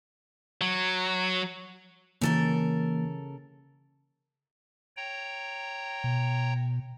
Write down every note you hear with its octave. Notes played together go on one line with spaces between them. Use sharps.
F#3
C#3 E3 A#3 A4 A#4
C#5 G5 A#5
B2